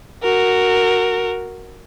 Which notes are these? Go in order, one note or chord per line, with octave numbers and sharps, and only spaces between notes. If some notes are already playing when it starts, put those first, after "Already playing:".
F#4 A#4